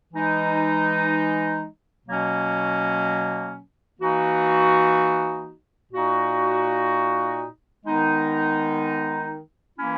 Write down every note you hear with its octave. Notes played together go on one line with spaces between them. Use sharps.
E3 G#3 D#4
B2 F#3 A#3 C#4
E3 A#3 D#4 F#4
A#2 A#3 D#4 F#4
D#3 G#3 B3 D#4
E3 A#3 C#4 E4